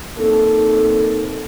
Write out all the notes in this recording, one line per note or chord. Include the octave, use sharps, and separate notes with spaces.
A#3 C4 D#4 A4